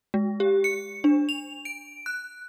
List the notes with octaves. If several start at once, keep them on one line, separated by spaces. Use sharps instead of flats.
G#3
G4
C#7
D4
F7
D7
F#6